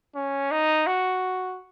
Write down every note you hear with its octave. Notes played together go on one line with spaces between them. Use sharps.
C#4
D#4
F#4